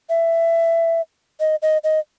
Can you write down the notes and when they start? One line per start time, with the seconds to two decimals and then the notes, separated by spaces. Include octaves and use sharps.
0.10 E5
1.40 D#5
1.62 D#5
1.84 D#5